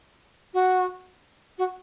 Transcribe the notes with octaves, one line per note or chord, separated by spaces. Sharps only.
F#4
F#4